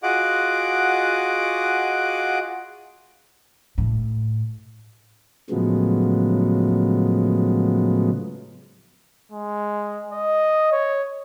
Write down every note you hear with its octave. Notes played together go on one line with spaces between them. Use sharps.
F4 F#4 G#4 D#5 F#5 D6
A2
A2 C#3 F3 F#3 G#3 B3
G#3
D#5
C#5